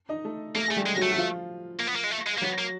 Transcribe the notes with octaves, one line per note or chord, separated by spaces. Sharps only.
D#4 D#5
A3 A4
A3 A#3 A4
A3 G#4
G3 G4
G#3
F#3 F#4
A3
F#4
F3 F4
A#3
B3
A#3
G#3
A3
G#3
A#3
F#3 B3 F#4
A#3